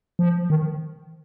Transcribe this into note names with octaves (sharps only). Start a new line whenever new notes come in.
F3
D#3